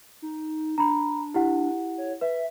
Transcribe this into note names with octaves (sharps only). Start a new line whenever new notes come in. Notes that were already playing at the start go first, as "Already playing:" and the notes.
D#4
D4 A#5 B5
E4 G4 F#5
C#5
B4 E5